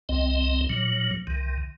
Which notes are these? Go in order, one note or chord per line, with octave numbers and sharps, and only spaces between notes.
C2 C4 D#5
A#2 F#3
C2 D#3